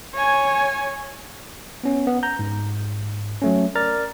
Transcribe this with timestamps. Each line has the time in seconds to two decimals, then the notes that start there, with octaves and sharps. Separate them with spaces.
0.15 C#5 G#5
1.83 B3 C#4
2.07 B3
2.23 A#5 G6
2.39 G#2
3.42 F#3 A3 C#4
3.75 A#4 D5 A#5 F6 A6